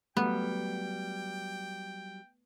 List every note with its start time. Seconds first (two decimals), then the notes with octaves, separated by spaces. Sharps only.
0.17 F#3 G3 A3 B3 G5